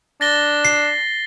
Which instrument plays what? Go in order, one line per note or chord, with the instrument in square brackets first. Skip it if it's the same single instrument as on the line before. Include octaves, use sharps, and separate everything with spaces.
[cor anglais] D4 [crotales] A6 A#6 G7
[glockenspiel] C7